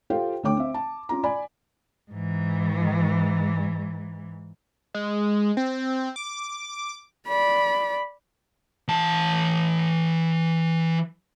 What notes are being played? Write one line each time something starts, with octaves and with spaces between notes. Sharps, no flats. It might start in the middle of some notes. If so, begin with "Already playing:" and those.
F4 G4 A4 C5 F5 G5
D2 D3 A3 C#5 G5 D6
C4 E5
A5
C#4 F4 A#5
D5 G#5 B5
G#2 E3
G#3
C4
D6
D5 B5
E3 A5